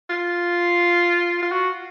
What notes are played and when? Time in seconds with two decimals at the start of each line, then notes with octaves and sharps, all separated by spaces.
0.09 F4
1.42 F4
1.52 F#4